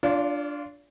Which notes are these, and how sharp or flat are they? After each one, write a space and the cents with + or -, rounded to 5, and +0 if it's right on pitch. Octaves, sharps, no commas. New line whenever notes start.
D4 +0 F4 +0 D5 -45